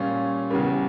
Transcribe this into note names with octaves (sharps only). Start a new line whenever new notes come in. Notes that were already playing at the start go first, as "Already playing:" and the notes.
Already playing: A#2 G3 C#4 F4
E2 C#3 G3